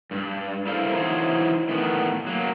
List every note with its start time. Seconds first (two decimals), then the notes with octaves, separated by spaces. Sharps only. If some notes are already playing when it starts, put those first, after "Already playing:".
0.11 G2
0.67 E4 A4 A#4 C5 F5
0.94 E3 D#4 E4 F#4 C5 C#5
1.69 A2 D#3 E3 B3
2.27 F#3 A#3